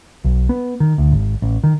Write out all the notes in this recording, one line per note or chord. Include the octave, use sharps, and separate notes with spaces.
B1
B3
D#3
D2
G#1
A1
D#3